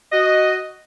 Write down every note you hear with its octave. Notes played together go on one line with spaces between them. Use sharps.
F#4 D#5